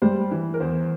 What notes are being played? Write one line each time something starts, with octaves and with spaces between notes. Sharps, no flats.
G3 C5
E3
A#4
E2 C5